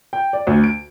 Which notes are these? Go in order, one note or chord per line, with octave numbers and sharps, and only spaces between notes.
G5
D5
D2
D7